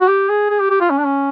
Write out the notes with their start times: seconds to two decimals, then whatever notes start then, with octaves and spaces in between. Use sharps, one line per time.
0.01 F#4
0.08 G4
0.29 G#4
0.50 G#4
0.60 G4
0.70 G4
0.80 F4
0.90 C#4
0.98 D4
1.05 C#4